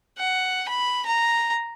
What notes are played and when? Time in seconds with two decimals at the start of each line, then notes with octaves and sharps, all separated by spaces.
0.19 F#5
0.69 B5
1.06 A#5